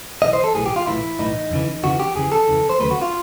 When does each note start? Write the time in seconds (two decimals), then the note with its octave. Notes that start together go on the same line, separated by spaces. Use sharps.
0.22 B1 A2 E3 D#5
0.33 C5
0.44 A4
0.54 B1 A2 E3 G#4
0.66 G4
0.76 F4
0.87 B1 A2 E3 E4
1.19 B1 A2 E3 D#4
1.51 F2 C#3 E3
1.83 F2 C#3 E3 F#4
2.00 G4
2.15 F2 C#3 E3 G#4
2.32 A4
2.48 F2 C#3 E3
2.69 C5
2.80 D#2 C#3 F#3 A3 B4
2.91 F#4
3.02 F4